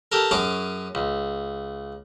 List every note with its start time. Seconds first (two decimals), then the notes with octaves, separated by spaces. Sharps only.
0.12 G4 A4 A#4
0.31 F#2 C#4 G#4 D6
0.95 C#2